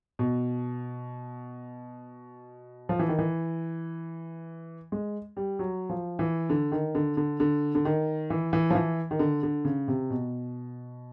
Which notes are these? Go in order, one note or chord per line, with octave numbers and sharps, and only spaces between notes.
B2
F3
E3
D#3
E3
G#3
G3
F#3
F3
E3
D3
D#3
D3
D3
D3
D3
D#3
E3
E3
F3
E3
D#3
D3
D3
C#3
C3
B2